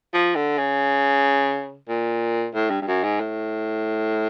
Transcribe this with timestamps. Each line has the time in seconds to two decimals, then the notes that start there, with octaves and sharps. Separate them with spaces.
0.14 F3
0.35 D3
0.58 C#3
1.88 A#2
2.54 A2
2.70 G2
2.81 G2
2.88 F#2
3.03 G#2
3.20 A2